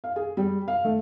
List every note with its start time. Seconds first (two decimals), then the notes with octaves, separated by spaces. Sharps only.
0.04 F5
0.16 G#4
0.37 G3
0.68 F5
0.84 A3